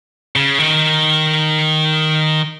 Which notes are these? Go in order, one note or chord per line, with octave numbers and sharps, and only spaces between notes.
C#3
D#3